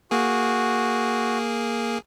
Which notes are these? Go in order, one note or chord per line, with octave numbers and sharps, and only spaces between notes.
A#3 F#4 G#4